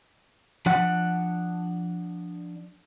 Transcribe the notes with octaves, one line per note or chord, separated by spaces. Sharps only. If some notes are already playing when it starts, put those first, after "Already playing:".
F3 D4 F#5